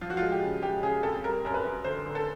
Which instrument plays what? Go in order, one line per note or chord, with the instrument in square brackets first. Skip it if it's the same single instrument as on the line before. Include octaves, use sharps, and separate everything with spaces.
[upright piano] F3 F4
F#4
G#3 F4
G4
C#3
G#3 G4
C#3 G#4
F2 A4
G3 A#4
F#2 A#4
B4
F#2
D3 C5
D3
A4